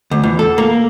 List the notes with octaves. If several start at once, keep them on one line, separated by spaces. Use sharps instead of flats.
D2
E2
A4
A#3